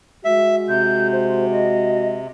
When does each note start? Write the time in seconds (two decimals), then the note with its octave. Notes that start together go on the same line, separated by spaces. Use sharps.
0.25 G#3 F#4 E5
0.68 C3 G6
1.11 C5
1.51 D#5